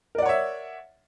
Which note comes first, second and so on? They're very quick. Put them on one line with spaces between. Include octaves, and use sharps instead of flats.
A#4 D5 F#5 C#5 E5